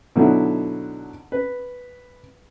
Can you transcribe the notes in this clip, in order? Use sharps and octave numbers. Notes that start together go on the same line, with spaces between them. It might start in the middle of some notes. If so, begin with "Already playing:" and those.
B2 D3 F#3 D#4 E4
B4